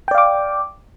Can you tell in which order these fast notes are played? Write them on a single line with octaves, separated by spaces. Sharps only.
G5 D5 F5 D6